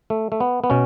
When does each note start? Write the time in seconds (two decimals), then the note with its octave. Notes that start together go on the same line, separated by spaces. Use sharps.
0.10 A3
0.32 A3
0.40 B3
0.64 B3
0.70 B2 C#4